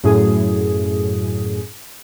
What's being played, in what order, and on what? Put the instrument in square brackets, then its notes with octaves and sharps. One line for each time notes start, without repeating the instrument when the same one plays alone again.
[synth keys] F#2 A2 G#4